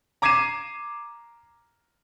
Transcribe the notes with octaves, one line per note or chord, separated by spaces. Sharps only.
A#5 D6 G#6 C7 D#7 E7